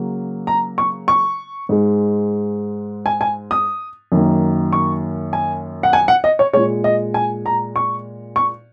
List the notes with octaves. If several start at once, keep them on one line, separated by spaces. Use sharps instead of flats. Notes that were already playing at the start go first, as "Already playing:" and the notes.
Already playing: C#3 F#3 A#3
A#5
C#6
C#6
G#2 G#3
G#5
G#5
D#6
F#2 D#3 A#3
C#6
G#5
F#5
G#5
F#5
D#5
C#5
A#2 G#3 C#5
D#5
G#5
A#5
C#6
C#6